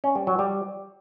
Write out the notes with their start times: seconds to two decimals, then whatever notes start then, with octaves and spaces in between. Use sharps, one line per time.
0.04 C#4
0.15 G3
0.27 F#3
0.39 G3